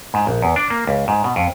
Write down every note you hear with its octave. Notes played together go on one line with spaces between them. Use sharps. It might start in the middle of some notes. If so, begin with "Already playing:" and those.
G#2
A#1
E2
D4
A#3
C#2
G#2
B2
F2